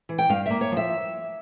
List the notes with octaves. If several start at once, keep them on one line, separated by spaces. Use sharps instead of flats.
E3
G5
G2 F5
A#3 E5
C#5
F3
E5